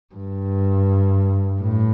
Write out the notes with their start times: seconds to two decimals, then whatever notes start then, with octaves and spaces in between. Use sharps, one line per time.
0.15 G2
1.62 A2